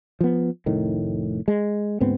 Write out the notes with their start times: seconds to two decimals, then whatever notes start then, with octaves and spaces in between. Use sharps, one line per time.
0.21 F3 B3
0.66 F1 A2 D#3
1.48 G#3
2.00 D2 G#2 B3 C4